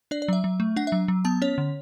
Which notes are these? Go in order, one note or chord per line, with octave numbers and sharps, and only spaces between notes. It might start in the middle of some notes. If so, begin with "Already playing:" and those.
D4 D5
D5
F#3 E5
F#3
A3
D4 F#5
E5
F#3
F#3
B3 A5
C#4 C#5
D3